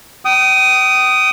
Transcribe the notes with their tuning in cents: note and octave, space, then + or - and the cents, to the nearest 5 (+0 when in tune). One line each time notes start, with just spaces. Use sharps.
G5 -40 D#6 +0